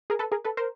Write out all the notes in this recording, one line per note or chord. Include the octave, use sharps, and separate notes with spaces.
G#4 A#4
A4 B4
G#4 A#4
A4 B4
A#4 C5